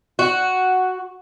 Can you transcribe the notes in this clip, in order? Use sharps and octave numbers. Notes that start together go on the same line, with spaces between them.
F#4